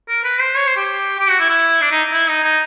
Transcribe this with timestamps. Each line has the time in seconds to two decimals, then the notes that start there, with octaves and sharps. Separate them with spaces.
0.09 A#4
0.24 B4
0.40 C5
0.56 C#5
0.67 C5
0.76 G4
1.19 G4
1.29 F#4
1.39 E4
1.50 E4
1.81 D4
1.91 D#4
2.13 E4
2.28 D#4
2.43 D#4